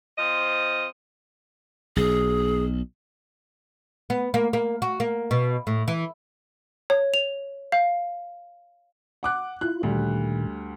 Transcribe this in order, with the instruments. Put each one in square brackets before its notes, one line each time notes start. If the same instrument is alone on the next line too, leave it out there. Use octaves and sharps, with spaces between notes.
[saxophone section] F3 C4 D#5
[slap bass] B1 [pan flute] G#4
[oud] B3
A#3
A#3
F#4
A#3
B2
A2
E3
[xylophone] C#5
F7
F5
[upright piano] F#5 D6 F#6
[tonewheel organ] E4 F4 [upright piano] F#6
[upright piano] D2 G3 [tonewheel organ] A#2 D#3